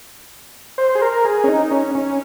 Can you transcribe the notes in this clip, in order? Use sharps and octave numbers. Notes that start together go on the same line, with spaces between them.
C5
G#4
A#4
G#4
C#4
D#4
C#4
C#4